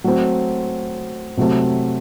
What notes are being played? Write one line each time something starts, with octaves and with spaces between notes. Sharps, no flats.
F#3 A3 C4
C3 F#3 A3 C4